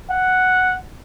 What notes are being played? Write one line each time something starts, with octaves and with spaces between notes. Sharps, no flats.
F#5